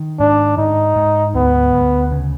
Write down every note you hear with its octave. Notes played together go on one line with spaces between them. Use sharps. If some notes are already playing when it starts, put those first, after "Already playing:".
Already playing: D#3
G#2 D4
G#2 D#4
G#2
D2 B3
D2
C#3